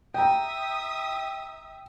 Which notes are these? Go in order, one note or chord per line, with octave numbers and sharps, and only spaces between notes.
E5 G5 A#5 D#6